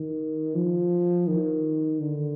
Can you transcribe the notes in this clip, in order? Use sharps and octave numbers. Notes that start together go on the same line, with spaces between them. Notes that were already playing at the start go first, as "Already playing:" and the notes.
Already playing: D#3
F3
D#3
D3